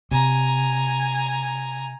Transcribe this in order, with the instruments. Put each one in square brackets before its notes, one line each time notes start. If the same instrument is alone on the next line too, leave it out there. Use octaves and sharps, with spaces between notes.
[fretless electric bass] C3 [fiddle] G#5 A#5